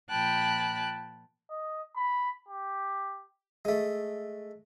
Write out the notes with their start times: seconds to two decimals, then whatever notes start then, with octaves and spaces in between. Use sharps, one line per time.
0.11 A#2 F3 G5 A5 B5 F#6
1.50 D#5
1.96 B5
2.49 G4
3.65 G#3 A3